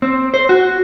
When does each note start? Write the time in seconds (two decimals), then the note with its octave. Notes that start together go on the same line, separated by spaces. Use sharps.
0.02 C4
0.34 C5
0.49 F#4